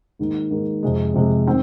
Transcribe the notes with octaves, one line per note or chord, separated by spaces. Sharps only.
G#2 D#3 A#3
G#2 D#3 A#3
F2 C3 G#3
F2 C3 G#3
D#3 C4